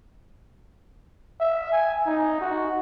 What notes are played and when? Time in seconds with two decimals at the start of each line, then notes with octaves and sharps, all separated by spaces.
1.40 E5
1.72 G#5
2.06 D#4
2.41 F#4